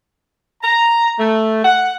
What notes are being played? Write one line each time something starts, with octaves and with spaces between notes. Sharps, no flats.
A#5
A3
F#5